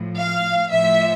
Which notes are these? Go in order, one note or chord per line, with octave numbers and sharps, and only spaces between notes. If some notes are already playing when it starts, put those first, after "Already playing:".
Already playing: A2 F3
F5
A2 F3 E5